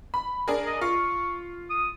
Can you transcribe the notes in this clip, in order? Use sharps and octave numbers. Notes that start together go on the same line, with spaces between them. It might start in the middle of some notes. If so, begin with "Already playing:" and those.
B5
D4 G#4 A#4
D#5
F4 C#6
D#6